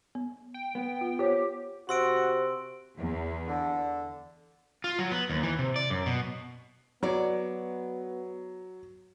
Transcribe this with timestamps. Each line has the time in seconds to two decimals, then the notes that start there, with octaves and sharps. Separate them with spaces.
0.15 B3
0.54 G5
0.75 B3
1.01 F4
1.19 F4 G4 C5 C#5
1.89 C3 F#4 C6 E6 D7
2.97 E2
3.48 D3
4.84 F4
4.99 F#3
5.11 B3
5.30 D#2
5.43 E3
5.59 C3
5.76 D5
5.90 F#2
6.06 B2
7.03 F#3 B3 C#5 D5